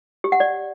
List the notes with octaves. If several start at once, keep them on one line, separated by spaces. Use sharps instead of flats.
G4
F#5
D5